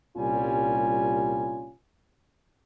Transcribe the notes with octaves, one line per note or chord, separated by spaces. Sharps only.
C2 A#2 G3 C#4 F4 G#5